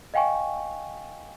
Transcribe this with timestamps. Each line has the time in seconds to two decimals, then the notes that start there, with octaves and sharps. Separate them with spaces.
0.14 D#5 F5 G5 G#5 C#6